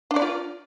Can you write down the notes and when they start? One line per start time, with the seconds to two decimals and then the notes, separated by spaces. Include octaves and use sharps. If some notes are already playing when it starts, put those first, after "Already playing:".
0.11 D4
0.16 D5
0.22 F4